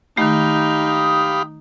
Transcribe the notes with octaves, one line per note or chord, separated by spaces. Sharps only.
D#3 A3 D#4 G4 F5 B5
D#6